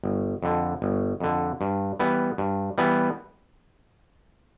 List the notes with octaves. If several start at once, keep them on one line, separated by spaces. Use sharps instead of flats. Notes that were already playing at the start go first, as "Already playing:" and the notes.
G1
F2 D3
G1
F2 D3
G2
E3 G3 B3
G2
E3 G3 B3